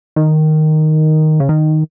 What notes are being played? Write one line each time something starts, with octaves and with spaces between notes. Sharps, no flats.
D#3
C#3
D#3